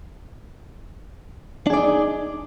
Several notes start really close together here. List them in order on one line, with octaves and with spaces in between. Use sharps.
D4 G#4 D5 D#4